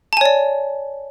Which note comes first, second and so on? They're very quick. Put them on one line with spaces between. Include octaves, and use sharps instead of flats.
A5 G#5 C#5 D5